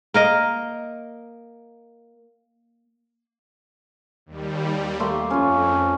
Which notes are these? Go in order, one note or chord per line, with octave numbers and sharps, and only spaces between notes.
A#3 A#4 D#5
D#2 G3
A3 A#3 C6
F2 C#4 F4